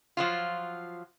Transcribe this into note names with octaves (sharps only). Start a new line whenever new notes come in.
F3 F#3 F4